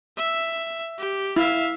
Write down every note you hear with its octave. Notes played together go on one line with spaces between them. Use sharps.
E5
G4
E4 E5 F5